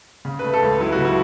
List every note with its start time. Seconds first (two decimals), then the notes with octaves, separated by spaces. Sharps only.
0.25 C#3
0.39 A3 B4
0.54 A4
0.62 C#2
0.80 F#3 E4
0.92 F#4
0.98 C#3
1.05 E4